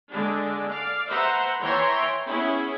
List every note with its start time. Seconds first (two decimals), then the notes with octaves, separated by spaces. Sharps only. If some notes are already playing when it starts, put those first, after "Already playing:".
0.11 D3 G#3 D4
0.69 D5 F5
1.08 B4 C5 E5 F#5 A#5
1.60 E3 C#5 E5 G5 A#5 C6
2.26 B3 C#4 E4 G#4